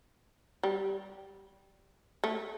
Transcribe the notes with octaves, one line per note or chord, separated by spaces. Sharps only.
G3
A3